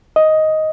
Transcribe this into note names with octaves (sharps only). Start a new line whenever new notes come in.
D#5